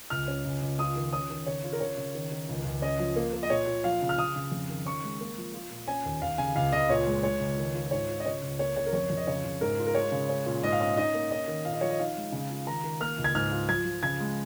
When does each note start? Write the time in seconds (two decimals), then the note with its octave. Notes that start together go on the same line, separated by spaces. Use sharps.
0.10 C#2 F6
0.28 C#4
0.45 C#2
0.62 C#2
0.79 F4 D#6
0.96 D#3
1.12 C#4 D#6
1.30 D#3
1.46 C#3 C#5
1.64 F4
1.73 A#4
1.80 C#3 C#5
1.98 C#3
2.15 D#3
2.32 D#3
2.49 C#2
2.65 C#2
2.82 C#4 D#5
2.99 F3
3.16 A#3
3.33 A#3
3.43 D#5
3.50 A#2 C#5
3.67 A#2
3.84 F3 F5
4.02 C#3
4.09 F6
4.18 C#3 D#6
4.36 C#3
4.52 F2
4.70 D#3
4.86 C#4 C#6
5.03 G#3
5.21 A#3
5.38 F3
5.54 F4
5.71 A#2
5.88 C#4 G#5
6.05 D#2
6.21 D#2 F5
6.38 C#3 G#5
6.56 C#2 F5
6.72 C#2 D#5
6.89 A#2 C#5
7.07 G#3
7.23 G#3 C#5
7.40 C#2
7.58 D#3
7.74 F4
7.91 G#2 C#5
8.09 F4
8.20 D#5
8.25 C#3 C#5
8.42 C#2
8.59 A#3 C#5
8.76 C#3 C#5
8.86 A#4
8.93 F2 C#5
9.10 F2
9.17 D#5
9.27 C#3 C#5
9.45 C#3
9.61 G#2 A#4
9.78 F4
9.87 A#4
9.95 G#3 C#5
10.12 C#3
10.29 C#4
10.46 A#2
10.63 G#2 D#5
10.72 F5
10.80 C#4 D#5
10.97 D#4 D#5
11.14 A#3
11.31 C#4 D#5
11.48 D#3
11.65 A#2 F5
11.73 D#5
11.81 F3 C#5
11.90 D#5
11.99 D#4 F5
12.16 G#3
12.32 C#3
12.50 F4
12.66 D#3 A#5
12.84 D#3
13.00 A#3 F6
13.18 C#2
13.24 G#6
13.35 G#2 F6
13.51 F4
13.68 F3 G#6
13.85 F3
14.03 C#3 G#6
14.20 G#3